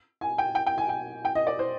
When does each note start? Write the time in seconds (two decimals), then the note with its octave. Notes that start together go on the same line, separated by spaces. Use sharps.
0.21 G#5
0.38 G5
0.55 G5
0.66 G5
0.78 G#5
0.89 G5
1.25 G5
1.35 D#5
1.47 D5
1.59 C5